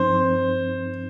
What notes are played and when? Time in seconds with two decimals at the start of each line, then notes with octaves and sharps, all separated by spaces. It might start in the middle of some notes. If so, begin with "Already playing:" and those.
Already playing: G2 F3 C4 D#4 C5